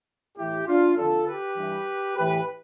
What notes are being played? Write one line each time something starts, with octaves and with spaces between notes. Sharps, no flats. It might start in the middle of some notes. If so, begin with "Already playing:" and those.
A2 E3 E4 G4
D4 F4
F2 D3 F4 A4
G4 B4
G2 E3
A2 E3 G4 B4